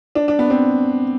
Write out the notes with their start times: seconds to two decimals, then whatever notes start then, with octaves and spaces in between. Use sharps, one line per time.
0.15 D4
0.28 D4
0.39 B3
0.50 C4